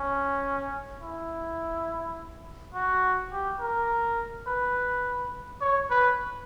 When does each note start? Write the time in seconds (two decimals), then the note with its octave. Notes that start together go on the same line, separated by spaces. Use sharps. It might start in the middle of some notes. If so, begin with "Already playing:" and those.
Already playing: C#4
1.02 E4
2.74 F#4
3.32 G4
3.60 A#4
4.47 B4
5.61 C#5
5.90 B4